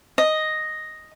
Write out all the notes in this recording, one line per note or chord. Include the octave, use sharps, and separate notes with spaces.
D#5